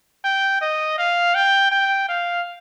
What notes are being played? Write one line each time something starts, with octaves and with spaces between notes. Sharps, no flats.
G5
D#5
F5
G5
G5
F5